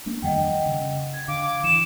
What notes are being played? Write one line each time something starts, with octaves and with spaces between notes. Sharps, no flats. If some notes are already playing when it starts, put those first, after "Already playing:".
A3 A#3 D4
F2 D#3 G3 D#5 F#5 G5
C#3
G#6
D3 F5 D6
E3 C#7 E7